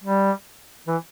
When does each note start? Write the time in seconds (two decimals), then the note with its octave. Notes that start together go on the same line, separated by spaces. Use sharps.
0.04 G3
0.88 E3